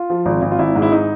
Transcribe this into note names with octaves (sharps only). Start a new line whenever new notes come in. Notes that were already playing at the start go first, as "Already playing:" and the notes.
Already playing: F4
F3
G#1
G#1
F4
G#1 E4
G#2
E4
D#4